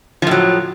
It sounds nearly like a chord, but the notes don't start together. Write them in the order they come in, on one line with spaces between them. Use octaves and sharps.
F3 A2 F#3